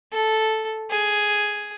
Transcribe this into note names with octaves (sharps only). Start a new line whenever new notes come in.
A4
G#4